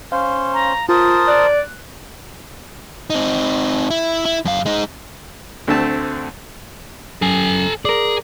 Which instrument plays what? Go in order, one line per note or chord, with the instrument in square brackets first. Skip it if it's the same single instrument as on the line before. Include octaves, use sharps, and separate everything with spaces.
[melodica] C#4 C5 [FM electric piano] F5
[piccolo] A#5
[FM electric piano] F4 [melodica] A#4 C5 A5 [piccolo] D#6
[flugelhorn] D5 [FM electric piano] F#6
[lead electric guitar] C4 D#4
E4
E4
F#2 F5
G#3 D#4
[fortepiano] D2 D3 A3 C4 A5
[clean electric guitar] F#2 [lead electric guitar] A4 G#5
[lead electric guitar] G#4 [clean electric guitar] A#4 D5